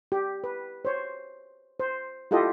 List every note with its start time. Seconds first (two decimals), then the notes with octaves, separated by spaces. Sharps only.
0.12 G4
0.44 B4
0.85 C5 C#5
1.80 C5
2.31 E4 F4 G4 A4 D#5